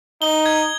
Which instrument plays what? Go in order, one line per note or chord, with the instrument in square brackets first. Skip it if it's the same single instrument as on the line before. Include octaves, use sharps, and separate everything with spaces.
[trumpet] D#4 [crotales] G7
[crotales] G#6